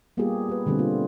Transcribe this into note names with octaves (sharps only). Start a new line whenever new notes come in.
G3 A#3 B3 F4 G4 G#4
G4 B4
B2 D3 G3 A3 A#3 C4
F4